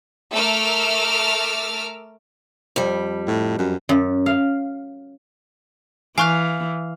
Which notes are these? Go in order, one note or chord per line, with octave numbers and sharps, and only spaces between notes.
A3 A#4 D6 E6 F6
F2 G3
A2
F#2
F#2
F5
E3 F5 G#5 C#6 F#6